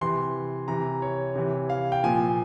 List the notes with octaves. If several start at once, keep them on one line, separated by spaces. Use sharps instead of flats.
C3 E3 C6
C3 E3 A#5
C#5
C3 E3
F5
G5
A#2 F3 G#5